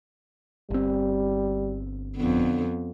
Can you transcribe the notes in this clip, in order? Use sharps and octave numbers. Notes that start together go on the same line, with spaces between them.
G1 G3 C4
F2 D3 B3